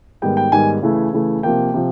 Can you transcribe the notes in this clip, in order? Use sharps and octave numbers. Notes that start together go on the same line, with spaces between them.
G#2 D#3 G3 B3 G5
G5
G#2 D#3 G3 B3 G#5
C#3 E3 A3
C#3 E3 A3
C3 F3 A#3 G5
C3 F3